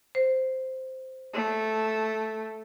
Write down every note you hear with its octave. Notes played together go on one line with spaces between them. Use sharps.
C5
A3